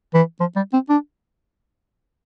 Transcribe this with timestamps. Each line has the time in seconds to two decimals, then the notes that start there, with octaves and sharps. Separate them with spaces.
0.14 E3
0.40 F3
0.56 G3
0.73 C4
0.89 D4